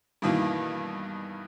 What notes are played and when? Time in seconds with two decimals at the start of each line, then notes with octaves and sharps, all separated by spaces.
0.22 G2 B2 D#3 E3 A#3